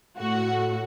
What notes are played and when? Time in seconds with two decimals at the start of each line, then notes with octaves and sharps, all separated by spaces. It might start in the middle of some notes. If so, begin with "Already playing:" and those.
0.18 A2 A3 F#4